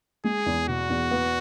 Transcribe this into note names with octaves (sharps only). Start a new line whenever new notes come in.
G#3 G#4
E2
B2 F#4
E2
B3